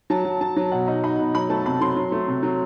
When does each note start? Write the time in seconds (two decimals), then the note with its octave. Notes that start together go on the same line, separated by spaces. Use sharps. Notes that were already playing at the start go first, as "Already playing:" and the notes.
0.10 F#3 A5
0.25 F#3
0.41 F#3 A5
0.56 F#3
0.71 B2 F#5
0.88 D#4
1.04 D#4 B5
1.19 B2
1.34 F#3 B5
1.50 A3 A5
1.66 C3 B5
1.81 F#3 C6
1.96 F#3
2.12 A3
2.28 C3
2.43 F#3